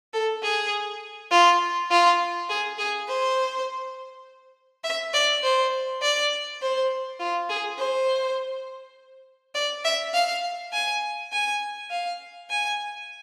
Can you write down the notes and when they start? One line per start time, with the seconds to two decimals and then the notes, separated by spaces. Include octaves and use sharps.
0.14 A4
0.43 G#4
1.31 F4
1.91 F4
2.49 G#4
2.78 G#4
3.08 C5
4.84 E5
5.14 D5
5.43 C5
6.02 D5
6.62 C5
7.20 F4
7.49 G#4
7.78 C5
9.55 D5
9.85 E5
10.14 F5
10.73 G#5
11.32 G#5
11.90 F5
12.50 G#5